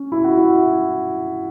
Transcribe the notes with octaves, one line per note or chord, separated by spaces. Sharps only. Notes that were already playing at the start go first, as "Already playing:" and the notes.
Already playing: C#4
E4
F#4
E4